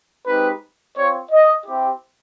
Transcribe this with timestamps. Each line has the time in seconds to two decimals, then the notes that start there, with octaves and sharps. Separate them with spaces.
0.27 G#3 C4 D#4 G4 B4
0.97 C4 F4 C#5
1.31 D#5
1.66 C4 E4 G4